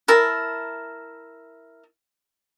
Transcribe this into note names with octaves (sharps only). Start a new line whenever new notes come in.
E4 A#4 A5